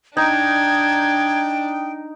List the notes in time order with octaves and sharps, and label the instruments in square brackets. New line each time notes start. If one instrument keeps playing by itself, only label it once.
[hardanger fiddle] D4 [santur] D#4 [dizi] G5 [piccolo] G#6